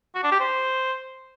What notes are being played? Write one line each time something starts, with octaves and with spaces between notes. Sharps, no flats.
F#4
D4
G4
C5